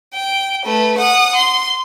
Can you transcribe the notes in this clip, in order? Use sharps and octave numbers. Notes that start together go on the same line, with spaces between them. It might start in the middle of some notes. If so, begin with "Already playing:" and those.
G5
A3 B4
F#5 D#6
C6